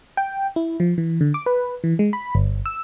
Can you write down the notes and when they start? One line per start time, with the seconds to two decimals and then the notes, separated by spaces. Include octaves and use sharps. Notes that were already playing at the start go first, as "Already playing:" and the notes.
0.17 G5
0.56 E4
0.80 F3
0.98 E3
1.21 D3
1.34 D6
1.46 B4
1.84 E3
1.99 G#3
2.13 B5
2.35 G1
2.66 E6